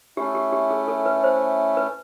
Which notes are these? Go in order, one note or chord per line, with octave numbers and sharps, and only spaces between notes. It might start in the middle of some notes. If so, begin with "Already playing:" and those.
A3 C#4 E4 G4
G4
G4
G#4
A4
B4
C5
B4